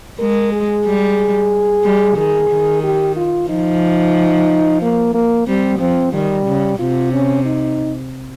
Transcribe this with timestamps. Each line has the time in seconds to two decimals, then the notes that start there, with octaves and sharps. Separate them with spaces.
0.19 G#3 A#4
0.52 G#4
0.85 G3
1.84 G3
2.17 D#3 G#4
2.50 D#3
2.83 G4
3.16 F4
3.49 F3 D#4
4.82 A#3
5.14 A#3
5.47 G3 C4
5.80 F3 C4
6.13 D#3 G3
6.47 C#3
6.79 C3 F4
7.13 C#4
7.45 D#4